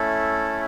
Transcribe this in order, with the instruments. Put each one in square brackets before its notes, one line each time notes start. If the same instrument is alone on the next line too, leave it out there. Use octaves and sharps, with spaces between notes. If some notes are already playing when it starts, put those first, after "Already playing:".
Already playing: [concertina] A3 C#4 E4 A4